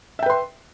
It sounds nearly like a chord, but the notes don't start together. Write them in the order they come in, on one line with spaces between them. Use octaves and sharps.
E5 G5 B4 C6